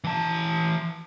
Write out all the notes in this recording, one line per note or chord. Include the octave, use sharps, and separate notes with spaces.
E3 A5